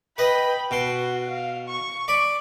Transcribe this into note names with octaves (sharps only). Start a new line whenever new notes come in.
B4 D#5 G5 B5
B2 F#4 C6
F5
C#6
D5 B5